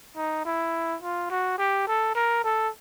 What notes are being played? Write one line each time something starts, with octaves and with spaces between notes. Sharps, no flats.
D#4
E4
F4
F#4
G4
A4
A#4
A4